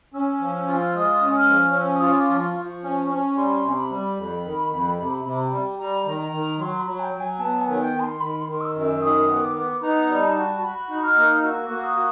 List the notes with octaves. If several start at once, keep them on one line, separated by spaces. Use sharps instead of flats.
C#4 E6
F3
F4
G#3 D#6
C#4
F6
F3
C#4 E6
D#6
F4
D6
F3
C#6
F3
C#4
C#4
G3 C6
C3
B5
G3
F2
D#3
F2
C3
C3
G3
G3 A#5
D#3
A#5
D#3
F#3 C6
B5
F#3
G5
F#3
G#5
B3 A5
G#5
D#3
G5
D#3
C6
D#3 B5
C6
D#3
E6
F#2
E6
D#3 D#6
B3
D6
B3
D#4 A#5
G3
A5
F#4
F#4 B5
D#4
F6
A#3
F6
F#4 E6
A#3
D#6
F#4